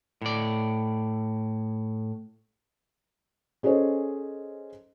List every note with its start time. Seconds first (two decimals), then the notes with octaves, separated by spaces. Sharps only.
0.22 A2 D5
3.63 C#4 G#4 A4 C5 C#5 D#5